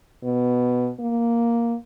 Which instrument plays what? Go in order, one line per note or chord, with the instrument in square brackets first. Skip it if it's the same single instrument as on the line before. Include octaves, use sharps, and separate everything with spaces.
[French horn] B2
A#3